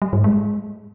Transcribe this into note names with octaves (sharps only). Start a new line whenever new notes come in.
G3
G#2
G#3